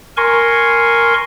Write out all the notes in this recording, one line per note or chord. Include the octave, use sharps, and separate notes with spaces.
A#4 G#5 C6 C#6